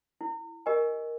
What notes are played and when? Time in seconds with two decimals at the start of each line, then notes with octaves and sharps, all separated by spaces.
0.21 E4
0.66 G4 A#4 D#5 G#5